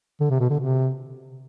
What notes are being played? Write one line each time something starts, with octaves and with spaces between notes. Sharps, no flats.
D3
C3
B2
D3
C3